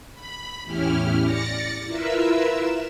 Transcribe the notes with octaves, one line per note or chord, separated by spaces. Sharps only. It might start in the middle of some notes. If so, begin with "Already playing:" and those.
B5
E2 A2 C#4 E4 G4 F6
D5 A6 A#6 C#7
E4 F4 A#4 B4 E5 E6